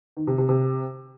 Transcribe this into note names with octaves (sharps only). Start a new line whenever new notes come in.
D#3
C3
C3
C3